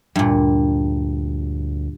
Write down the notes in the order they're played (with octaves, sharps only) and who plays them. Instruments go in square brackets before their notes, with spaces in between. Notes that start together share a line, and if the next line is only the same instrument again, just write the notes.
[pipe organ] D2 [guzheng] G2 A#2